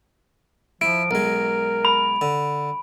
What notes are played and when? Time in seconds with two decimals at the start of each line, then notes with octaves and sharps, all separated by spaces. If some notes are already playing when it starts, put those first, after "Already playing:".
0.81 F3 E4 D7
1.11 B1 G#3 A#4
1.85 B5
2.21 D3